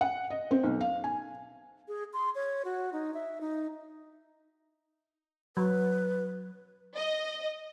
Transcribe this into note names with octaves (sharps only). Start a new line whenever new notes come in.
F#5
D#5
C4
B1
F5
G#5
G#4
C6
C#5
F#4
D#4
E5
D#4
F#3 B4
D#5